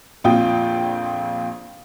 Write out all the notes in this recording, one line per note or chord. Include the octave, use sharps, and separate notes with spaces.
A#1 F2 A#2 F4 G5 D#6